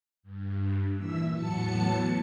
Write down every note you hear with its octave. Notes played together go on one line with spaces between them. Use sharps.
G2
D#2 A#2 E3 E5 E6
E2 A2 F#3 B3 A5 C#7